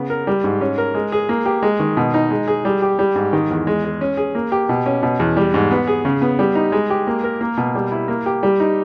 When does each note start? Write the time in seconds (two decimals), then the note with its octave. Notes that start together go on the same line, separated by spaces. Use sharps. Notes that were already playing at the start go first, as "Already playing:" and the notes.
Already playing: C#3 B3
0.10 A#4
0.27 G3
0.44 G#2
0.61 C#4
0.78 A#4
0.95 G#3
1.12 G#4
1.29 A#3
1.46 G4
1.63 G#3
1.80 D#3
1.97 B2
2.14 D#4
2.31 G#3
2.48 G#4
2.65 G3
2.82 G4
2.99 G3
3.16 G#2
3.33 D#3
3.50 E2
3.67 G#3
3.84 G#4
4.01 C#4
4.17 G#4
4.35 A#3
4.52 G4
4.69 B2
4.86 C#4
5.03 B2
5.20 E2
5.37 G3
5.54 G#2
5.71 B3
5.87 G#4
6.05 C#3
6.22 B3
6.39 G3
6.55 D#4
6.72 G#3
6.90 G4
7.07 A#3
7.24 A#4
7.41 A#3
7.57 B2
7.75 G3
7.92 E4
8.08 A#3
8.26 G4
8.43 G3
8.60 D#4